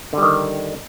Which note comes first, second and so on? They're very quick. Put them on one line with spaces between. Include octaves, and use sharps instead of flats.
D3 G3 D#3